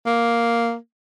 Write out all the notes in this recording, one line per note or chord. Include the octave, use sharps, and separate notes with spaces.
A#3